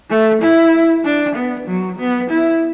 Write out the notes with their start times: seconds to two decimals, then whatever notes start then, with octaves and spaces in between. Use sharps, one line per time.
0.10 A3
0.41 E4
1.05 D4
1.35 B3
1.67 F#3
1.99 B3
2.30 E4